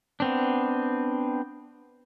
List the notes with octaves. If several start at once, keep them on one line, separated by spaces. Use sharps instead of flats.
B3 C4 D4